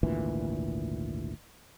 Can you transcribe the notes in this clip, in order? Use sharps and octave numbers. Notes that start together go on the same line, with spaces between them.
G#1 D2 A#2 E3